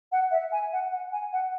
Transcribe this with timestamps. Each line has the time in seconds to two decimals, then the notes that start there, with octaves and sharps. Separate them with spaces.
0.12 F#5
0.31 E5
0.52 G#5
0.72 F#5
0.92 F#5
1.12 G#5
1.33 F#5